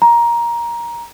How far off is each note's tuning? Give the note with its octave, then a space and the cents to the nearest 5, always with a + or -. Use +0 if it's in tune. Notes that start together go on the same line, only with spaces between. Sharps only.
A#5 +15